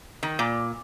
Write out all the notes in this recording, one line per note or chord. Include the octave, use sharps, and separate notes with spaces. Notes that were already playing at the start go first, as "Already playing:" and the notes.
D#3
A#2